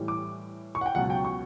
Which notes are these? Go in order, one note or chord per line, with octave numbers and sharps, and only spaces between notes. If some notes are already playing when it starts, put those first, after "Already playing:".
Already playing: A2 E3 G3
D6
C#6
F#5
G5
C#2 B2 F#3 F#5
G5
C#6